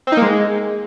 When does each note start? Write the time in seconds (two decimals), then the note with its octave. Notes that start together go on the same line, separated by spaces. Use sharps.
0.07 C4
0.12 D#4
0.17 A#3
0.22 G#3